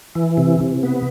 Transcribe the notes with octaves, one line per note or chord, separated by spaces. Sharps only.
E3
C3
C3
B3